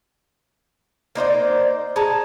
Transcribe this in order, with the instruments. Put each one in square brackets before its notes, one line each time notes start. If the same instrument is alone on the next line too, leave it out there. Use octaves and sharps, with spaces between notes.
[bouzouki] A#3 D#4 C5 D5
G#4 A5 A#5